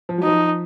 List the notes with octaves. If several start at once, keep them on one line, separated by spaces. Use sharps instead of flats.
F3
F#3
F3 D#4